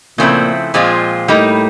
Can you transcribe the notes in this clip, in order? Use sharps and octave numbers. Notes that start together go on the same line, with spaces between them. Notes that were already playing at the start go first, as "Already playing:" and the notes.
A#2 C#3 F3 A3 C4 E4
A#2 F3 G#3 C4 F4
A2 G3 A#3 D#4